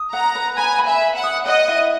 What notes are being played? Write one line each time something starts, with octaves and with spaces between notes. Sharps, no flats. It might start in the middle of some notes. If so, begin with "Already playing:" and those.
Already playing: D#6
F#5 A#5
B4
G#5 B5
B5
E5
B5
F#5
D#6
D#5 F#5
E4